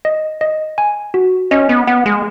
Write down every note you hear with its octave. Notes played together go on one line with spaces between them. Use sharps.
D#5
D#5
G#5
F#4
C#4 D#5
B3
B3 F#5
G#3